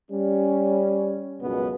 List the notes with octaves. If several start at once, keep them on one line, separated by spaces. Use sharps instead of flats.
G3 C#4
C#2 F#2 B2 B3